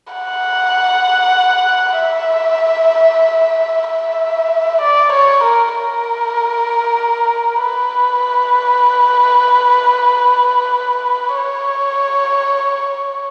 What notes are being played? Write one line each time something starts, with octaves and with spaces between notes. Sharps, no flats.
F#5
E5
E5
D5
C#5
A#4
A#4
B4
C#5